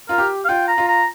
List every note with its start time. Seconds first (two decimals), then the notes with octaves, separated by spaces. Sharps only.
0.09 F4 A#4
0.18 G4
0.45 F5
0.49 F4 G5
0.68 A#5
0.78 F4
0.88 A#5